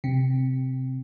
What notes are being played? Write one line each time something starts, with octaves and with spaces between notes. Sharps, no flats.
C3